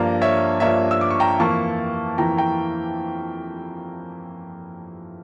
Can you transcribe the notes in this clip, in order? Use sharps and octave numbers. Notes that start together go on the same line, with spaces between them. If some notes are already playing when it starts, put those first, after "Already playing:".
Already playing: G2 F3 A#3 D4 A#5
C#5 E5
G2 F3 A#3 D4 C#5 E5
E6
D6
C#6
G5 A#5
F2 E3 A#3 E4 A5 C#6
F2 E3 A#3 E4 G5 A#5
G5 A#5